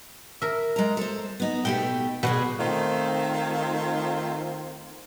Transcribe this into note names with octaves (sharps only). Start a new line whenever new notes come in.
A#4 E5
G#3 A#5
A4 C5
B3 D#4
B2 A3 G4 G5
B2 B3 G#4 C5 D5
D#3 A3 C4 D#4 F4 C5